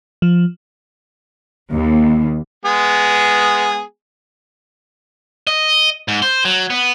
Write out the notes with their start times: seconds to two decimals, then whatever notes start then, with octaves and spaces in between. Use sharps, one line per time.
0.22 F3
1.71 D#2
2.65 G#3 B3 G#4
5.47 D#5
6.08 G#2
6.22 C5
6.45 F#3
6.70 B3